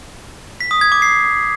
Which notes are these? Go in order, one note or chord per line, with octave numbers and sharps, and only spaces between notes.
B6
D#6
G#6
D6
C7